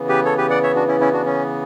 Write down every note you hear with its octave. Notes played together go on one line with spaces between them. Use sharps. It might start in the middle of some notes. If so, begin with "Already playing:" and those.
Already playing: C#3 E3 B3
G4 B4
A4 C#5
G4 B4
D5 F#5
C#5 E5
D4 F#4
C#4 E4
C#4 E4
D4 F#4
C#4